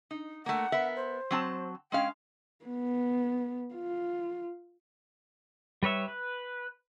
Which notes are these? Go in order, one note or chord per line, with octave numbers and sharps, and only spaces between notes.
D#4
A3 A#3 F#5
B3 A#4 E5
C5
F#3 C4 A5
G#3 C#4 F5 G5
B3
F4
G3 B4 C#5 E5
B4